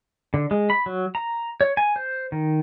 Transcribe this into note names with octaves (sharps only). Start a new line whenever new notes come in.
D3
G#3
B5
F#3
A#5
C#5
G#5
C5
D#3